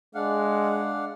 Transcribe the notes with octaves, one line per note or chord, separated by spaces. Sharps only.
G#3 D4 F5 F#5